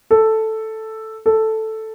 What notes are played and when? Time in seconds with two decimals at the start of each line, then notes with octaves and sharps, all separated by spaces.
0.11 A4
1.26 A4